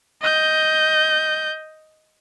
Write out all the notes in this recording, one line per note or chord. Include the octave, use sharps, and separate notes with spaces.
D#5 G6